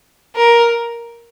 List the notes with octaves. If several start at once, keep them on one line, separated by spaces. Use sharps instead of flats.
A#4